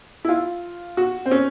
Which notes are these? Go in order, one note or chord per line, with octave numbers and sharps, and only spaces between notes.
E4
F4
F#4
C4
C#4